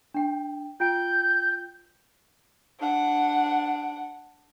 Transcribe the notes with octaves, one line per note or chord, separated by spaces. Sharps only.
D4 G5
F4 G5 G6 D7
D4 F#5